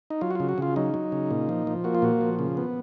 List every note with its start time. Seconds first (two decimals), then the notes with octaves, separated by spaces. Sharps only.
0.10 D#4
0.21 F#3 F4
0.31 F#4
0.35 C#3 F4
0.49 F#4
0.58 C#3 F4
0.76 F#3 D#4
0.94 F#3
1.12 C#3
1.31 A#2
1.49 F3
1.67 F3
1.84 A#3 F#4
1.95 F4
2.02 A#2 F#4
2.21 F3
2.39 C#3
2.57 B3